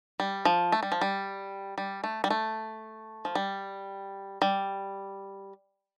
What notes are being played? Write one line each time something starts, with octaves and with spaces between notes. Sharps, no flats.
G3
F3
A3
G3
F3
G3
G3
A3
G3
A3
F3
G3
G3